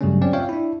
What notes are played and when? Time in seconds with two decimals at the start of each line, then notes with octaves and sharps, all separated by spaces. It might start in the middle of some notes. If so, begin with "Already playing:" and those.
0.01 G2 C#3 F#3 G3 A3 C#4
0.22 C4 C#4 G4 D5
0.33 F4 C#5 E5 F5 G5
0.49 D4 E4